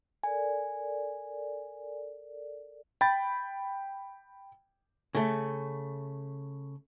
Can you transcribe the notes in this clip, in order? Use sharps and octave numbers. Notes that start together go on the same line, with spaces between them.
A4 A#4 D5 G#5
G5 B5 A6
C#3 A3